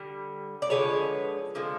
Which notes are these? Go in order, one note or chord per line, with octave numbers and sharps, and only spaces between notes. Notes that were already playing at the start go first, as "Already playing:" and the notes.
Already playing: D3 G3
D5
D3 F3 G#3 B4 C#5
D3 F3 G#3